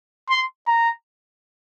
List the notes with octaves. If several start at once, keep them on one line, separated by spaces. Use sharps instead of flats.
C6
A#5